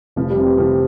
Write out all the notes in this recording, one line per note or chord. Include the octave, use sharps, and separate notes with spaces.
F1 F3
G3
F2 C3 E3
G3
F1 F3